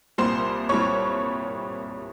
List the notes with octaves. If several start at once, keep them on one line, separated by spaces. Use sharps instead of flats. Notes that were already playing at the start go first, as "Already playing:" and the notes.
C2 A#2 G3 C5 C6
C2 A#2 G3 C#5 C#6